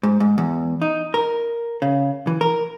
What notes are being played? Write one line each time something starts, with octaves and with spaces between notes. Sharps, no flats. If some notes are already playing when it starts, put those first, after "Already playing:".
G#2
G#2
E2
D#4
A#4
C#3
E3
A#4